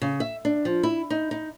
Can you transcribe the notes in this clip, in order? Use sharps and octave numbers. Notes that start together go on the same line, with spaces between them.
C#3
E5
D4
F3
E4
D#4
D#4